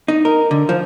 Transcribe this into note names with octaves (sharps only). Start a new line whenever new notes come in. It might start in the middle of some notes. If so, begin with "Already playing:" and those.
D#4
A#4
D3
F3